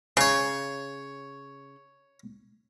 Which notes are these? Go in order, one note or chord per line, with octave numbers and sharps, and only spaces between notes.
C#3 C#5 C#6